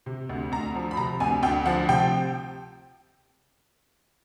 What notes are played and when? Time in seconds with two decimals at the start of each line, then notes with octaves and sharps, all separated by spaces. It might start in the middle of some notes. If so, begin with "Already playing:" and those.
0.06 C3
0.29 D2
0.52 D2 A#5
0.75 F3
0.91 B5
0.97 C3 A#5
1.20 D2 G#5
1.43 D2 G5
1.66 F3 F#5
1.89 C3 G5